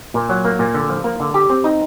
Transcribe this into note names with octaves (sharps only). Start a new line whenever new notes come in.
A#2
F#3
A#3
A#2
D3
F3
A#3
D3
G4
C4
D#4